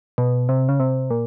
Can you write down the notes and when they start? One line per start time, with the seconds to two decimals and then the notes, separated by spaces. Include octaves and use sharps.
0.18 B2
0.49 C3
0.69 C#3
0.80 C3
1.11 A#2